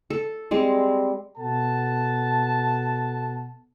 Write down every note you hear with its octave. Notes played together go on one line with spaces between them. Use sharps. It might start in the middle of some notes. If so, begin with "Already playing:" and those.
A4
G3 G#3 C4
B2 A4 F#5 A5